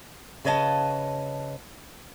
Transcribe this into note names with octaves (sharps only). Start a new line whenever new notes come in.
C#3 B4 C#5 D#5 F#5 A5